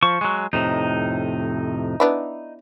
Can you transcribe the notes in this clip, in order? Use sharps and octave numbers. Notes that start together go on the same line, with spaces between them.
F3 C#6
F#3 G#3
F2 A2 C3 D#4
B3 D4 E4